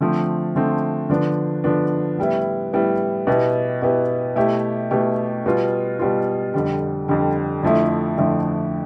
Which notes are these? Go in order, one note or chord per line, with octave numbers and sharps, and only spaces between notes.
D3 F3 A3 C4
D3 F3 A3 C4
D3 F3 B3 D4
D3 F3 B3 D4
A2 G3 B3 E4
A2 G3 B3 E4
B2 B3 E4 G4
B2 B3 E4 G4
B2 A3 E4 G4
B2 A3 E4 G4
B2 G3 B3 F4
B2 G3 B3 F4
F2 D3 G3
F2 D3 G3
F2 D3 F3 A3 E4
F2 D3 F3 A3 E4